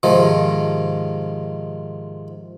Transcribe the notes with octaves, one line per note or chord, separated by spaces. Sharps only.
G#2 C3 D#3 F3